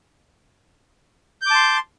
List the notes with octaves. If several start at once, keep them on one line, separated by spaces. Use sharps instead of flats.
A5 C6 D6 G6